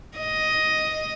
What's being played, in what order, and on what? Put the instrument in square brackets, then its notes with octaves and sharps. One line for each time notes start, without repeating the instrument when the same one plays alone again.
[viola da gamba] D#5